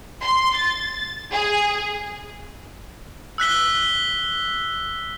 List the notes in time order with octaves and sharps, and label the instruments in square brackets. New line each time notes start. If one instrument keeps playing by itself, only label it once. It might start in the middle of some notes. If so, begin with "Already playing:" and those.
[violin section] C6
A6
G#4
[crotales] E6 F#6 B6 G7